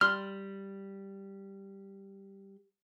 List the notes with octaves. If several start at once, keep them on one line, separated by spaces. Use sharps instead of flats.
G3 C6 F6